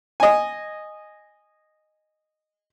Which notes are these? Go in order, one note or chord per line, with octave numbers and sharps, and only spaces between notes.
D#5 G#5